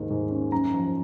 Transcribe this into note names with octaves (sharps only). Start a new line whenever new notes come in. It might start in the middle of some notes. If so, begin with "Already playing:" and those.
Already playing: D#2 G#2 D#3
G#2
C#4
F#2 A#5
F3